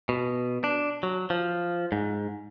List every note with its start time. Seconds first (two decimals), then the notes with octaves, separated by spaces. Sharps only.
0.09 B2
0.64 D4
1.03 F#3
1.30 F3
1.92 G#2